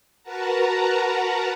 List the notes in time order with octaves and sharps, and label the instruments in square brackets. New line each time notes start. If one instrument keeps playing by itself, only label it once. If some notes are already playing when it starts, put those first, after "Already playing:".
[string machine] F#4 A#4 B4 F#5 A5 A#5